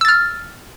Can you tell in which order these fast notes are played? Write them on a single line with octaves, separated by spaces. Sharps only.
E6 A6 F6